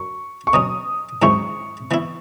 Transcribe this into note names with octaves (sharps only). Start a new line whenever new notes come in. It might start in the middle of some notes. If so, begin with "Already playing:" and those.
Already playing: F#2 F#3 C#6
C#6
B2 F#3 C#4 D#6
G#2 D#3 F#3 C#4 E4 C#6
E3 B3 E4